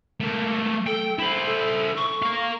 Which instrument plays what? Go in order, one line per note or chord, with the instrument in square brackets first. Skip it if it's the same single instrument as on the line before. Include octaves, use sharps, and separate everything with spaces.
[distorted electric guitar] A3 A#3
[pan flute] A4 [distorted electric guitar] G5
[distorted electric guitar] E4 C5 [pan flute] B5
[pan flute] A4
C#6
[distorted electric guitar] A#4 F5